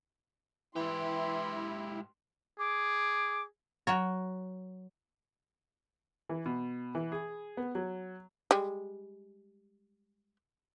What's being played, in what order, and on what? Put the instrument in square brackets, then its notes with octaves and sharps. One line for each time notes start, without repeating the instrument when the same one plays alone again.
[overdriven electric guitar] G#2 G4 [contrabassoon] E3 [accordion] E4 [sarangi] C6
[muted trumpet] G#4 [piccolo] D6
[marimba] F#3 [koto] F#4 A#4 C#5
[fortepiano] E3
B2
E3
G#4
B3
F#3
[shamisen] G3 G#3